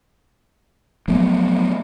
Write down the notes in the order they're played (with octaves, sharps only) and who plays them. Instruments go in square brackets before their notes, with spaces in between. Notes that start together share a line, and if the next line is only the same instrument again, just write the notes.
[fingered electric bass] F3 F#3 A3 B3